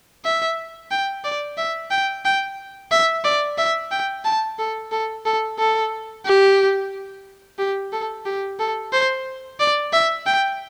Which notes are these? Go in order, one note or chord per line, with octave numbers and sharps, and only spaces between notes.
E5
G5
D5
E5
G5
G5
E5
D5
E5
G5
A5
A4
A4
A4
A4
G4
G4
A4
G4
A4
C5
D5
E5
G5